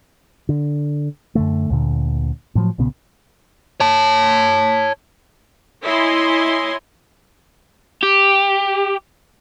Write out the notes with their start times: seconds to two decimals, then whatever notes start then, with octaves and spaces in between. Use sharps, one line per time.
0.49 D3
1.35 F#2 D3 A3
1.70 D2 A#2 D3
2.55 A2 F3 F#3
2.78 B1 A#2 C#3 B3
3.80 C#5 A5
5.82 E4 C#5 D#5 G#5 C6
8.03 G4